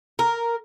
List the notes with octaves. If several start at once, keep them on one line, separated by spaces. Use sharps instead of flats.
A#4